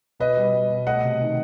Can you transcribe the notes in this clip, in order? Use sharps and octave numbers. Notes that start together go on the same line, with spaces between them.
B2 B4 D#5
G3
G3
B2
A3 D#5 F#5
C3
D#3